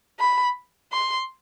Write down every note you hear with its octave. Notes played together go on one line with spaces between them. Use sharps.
B5
C6